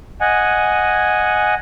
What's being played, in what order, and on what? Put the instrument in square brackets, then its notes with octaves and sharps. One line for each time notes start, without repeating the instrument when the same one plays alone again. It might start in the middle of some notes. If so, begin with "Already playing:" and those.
[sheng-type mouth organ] D#5 F#5 G#5